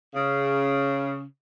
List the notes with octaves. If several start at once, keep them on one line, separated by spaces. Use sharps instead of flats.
C#3